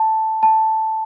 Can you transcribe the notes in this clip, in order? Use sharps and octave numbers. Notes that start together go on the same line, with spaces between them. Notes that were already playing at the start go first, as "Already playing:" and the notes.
Already playing: A5
A5